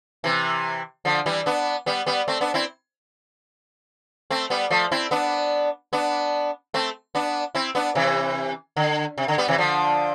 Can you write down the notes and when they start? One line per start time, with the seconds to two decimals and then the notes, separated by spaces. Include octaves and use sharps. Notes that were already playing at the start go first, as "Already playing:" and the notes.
0.24 C3 E3
1.05 D3 F3
1.26 E3 G3
1.46 B3 D4
1.86 G3 B3
2.06 G3 B3
2.28 A3 C4
2.41 B3 D4
2.54 C4 E4
4.30 A3 C4
4.50 G3 B3
4.70 F3 A3
4.92 C4 E4
5.11 B3 D4
5.93 B3 D4
6.74 A3 C4
7.15 B3 D4
7.55 C4 E4
7.75 B3 D4
7.95 C3 E3
8.77 D3
9.18 C3
9.28 D3
9.38 G3 B3
9.48 C3 E3
9.58 D3 F3